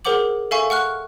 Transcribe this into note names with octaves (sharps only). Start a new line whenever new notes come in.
G#4 A#4 C5 F#5 D6 F#7
A4 E5 F5 G#5 C#6
F#5 C#6 F6 F#6